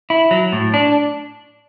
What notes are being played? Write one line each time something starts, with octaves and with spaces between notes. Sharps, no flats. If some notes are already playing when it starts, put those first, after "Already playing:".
E4
F#3
A2
D4